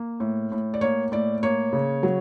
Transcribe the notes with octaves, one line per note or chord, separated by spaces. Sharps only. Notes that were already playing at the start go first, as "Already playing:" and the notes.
Already playing: A#3
A2
A2
D5
A#3 C#5
A2 D5
A#3 C#5
C#3
F#3